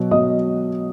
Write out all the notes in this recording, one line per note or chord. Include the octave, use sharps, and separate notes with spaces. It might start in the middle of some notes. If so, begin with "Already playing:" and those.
Already playing: B2 F#3
B2 F#3 D#5 D#6